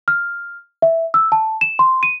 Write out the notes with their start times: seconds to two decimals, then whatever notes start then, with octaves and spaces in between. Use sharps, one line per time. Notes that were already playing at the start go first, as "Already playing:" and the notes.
0.08 F6
0.82 E5
1.14 E6
1.32 A5
1.61 E7
1.79 C6
2.03 D#7